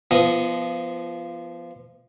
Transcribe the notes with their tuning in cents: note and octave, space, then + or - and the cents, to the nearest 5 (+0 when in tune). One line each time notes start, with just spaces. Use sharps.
F3 -20 B3 +0 D#5 +0